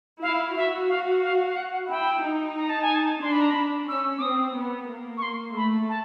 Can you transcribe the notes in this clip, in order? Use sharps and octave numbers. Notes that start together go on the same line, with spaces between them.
E4 F5
F#4 E5
F5
F5
F5
F#5
F#5
E4 G5
D#4
A#5
A5
G#5
A5
D4 C6
B5
A#5
D4 B5
C#4 E6
D6
C4 D#6
B3
A#3
C#6
C6
A3 B5
A5